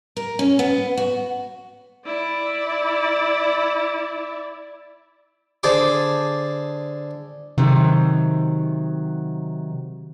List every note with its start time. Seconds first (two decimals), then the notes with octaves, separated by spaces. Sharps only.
0.17 A#4
0.39 C#4
0.59 B3
0.97 F#4
2.05 E4 D5
5.63 D3 G#4 C5 A5 D6
7.58 C3 D#3 F#3